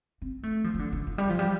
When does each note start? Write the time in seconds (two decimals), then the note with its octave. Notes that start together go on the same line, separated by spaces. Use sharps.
0.22 C4
0.43 A3
0.64 F3
0.74 F3
0.79 D3
0.93 D3
1.07 F3
1.18 G3
1.29 F3
1.39 G3